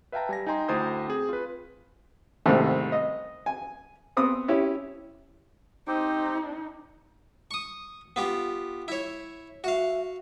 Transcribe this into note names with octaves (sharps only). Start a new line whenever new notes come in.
B4 E5 F5 G5 A5 A#5
G3 G#5 A#6
D#4 G5 G#5 A#5 C6
D2 E4 C5 G5 D#6 G6
C4 G#4
F4 B4
C2 G#2 C3 D#3 A3
D#5
G#5
B3 C4 D#6
C#4 E4 G4
C4 D#4 G4 C5
C#6 D#6
B3 F4 G4
E4 C#5
F#4 E5 F5